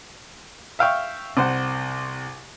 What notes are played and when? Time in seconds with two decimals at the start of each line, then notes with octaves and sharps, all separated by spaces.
0.79 E5 F5 G5 C#6
1.37 C2 C5 F#5